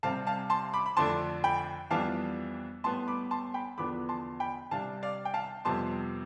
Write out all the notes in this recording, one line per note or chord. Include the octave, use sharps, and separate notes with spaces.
C3 G3 C4 F5 A5
F5 A5
A5 C6
B5 D6
B5
F2 D3 A3 D4 A5 C6
G5 B5
F2 E3 G3 B3 D4 F5 A5
A2 G3 B3 A5 C6
B5 D6
A5 C6
G5 B5
E2 D3 F3 B3 D4 B5 D6
A5 C6
G5 B5
C3 G3 D4 F5 A5
D5 F5
G5
F5 A5
F2 C3 G3 B3 A5 C6